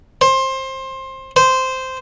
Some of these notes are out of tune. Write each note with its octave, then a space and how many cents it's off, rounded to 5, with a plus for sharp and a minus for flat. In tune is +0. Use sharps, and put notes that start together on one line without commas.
C5 +20
C5 -10